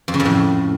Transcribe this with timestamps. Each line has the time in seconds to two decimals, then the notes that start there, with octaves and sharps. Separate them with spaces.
0.08 F2
0.14 C#3
0.20 F2
0.25 A2